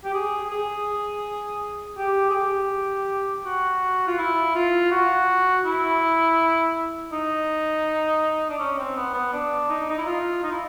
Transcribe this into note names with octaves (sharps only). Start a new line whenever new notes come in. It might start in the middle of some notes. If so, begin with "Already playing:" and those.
G4
G#4
G#4
G4
G#4
G4
F#4
F4
E4
F4
F#4
E4
D#4
D4
C#4
C4
B3
B3
D4
D#4
D#4
E4
F4
D#4
E4